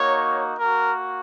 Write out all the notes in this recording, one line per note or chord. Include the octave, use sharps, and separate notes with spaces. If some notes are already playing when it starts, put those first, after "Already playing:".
Already playing: A#3 D#4 F#4 C#5
A#3 F#4 A#4